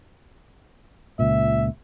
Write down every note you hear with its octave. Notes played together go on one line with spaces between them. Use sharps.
C#2 A#2 E5